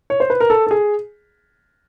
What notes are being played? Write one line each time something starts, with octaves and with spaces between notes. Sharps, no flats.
C#5
C5
B4
A#4
A4
A4
G#4